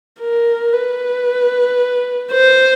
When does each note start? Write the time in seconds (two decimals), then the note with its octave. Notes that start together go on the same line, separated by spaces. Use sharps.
0.20 A#4
0.73 B4
2.32 C5